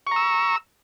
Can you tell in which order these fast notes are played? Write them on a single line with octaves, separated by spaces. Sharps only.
C#6 A#5 E6